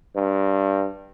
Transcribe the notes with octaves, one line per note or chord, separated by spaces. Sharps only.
G2